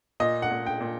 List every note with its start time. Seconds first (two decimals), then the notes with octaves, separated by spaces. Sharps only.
0.20 A#2 D#5
0.42 F#5
0.51 A#2
0.66 G5
0.81 A#2